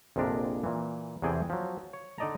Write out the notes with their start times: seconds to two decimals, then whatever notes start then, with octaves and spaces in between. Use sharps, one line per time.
0.16 A#1 F2 C3 G#3 D4 A#4
0.64 A#2 E3
1.22 E2 C3 E3 G#4 A4 G5
1.50 F3 F#3
1.93 C#5
2.18 D3 D#4 D5 D#5 A5 A#5